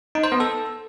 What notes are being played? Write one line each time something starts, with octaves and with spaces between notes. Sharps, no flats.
D#4
C5
B3
A4